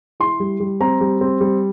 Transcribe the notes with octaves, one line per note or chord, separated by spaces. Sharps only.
E4 C6
G3
G3
C4 A#5
G3
C4
G3